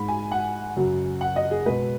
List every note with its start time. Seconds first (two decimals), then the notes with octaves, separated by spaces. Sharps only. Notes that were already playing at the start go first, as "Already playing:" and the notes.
Already playing: G#2 G#3 B5
0.08 G#5
0.31 F#5
0.77 F#2 C#3 F#3
1.21 F#5
1.36 D#5
1.51 G#4
1.66 B2 G#3 B4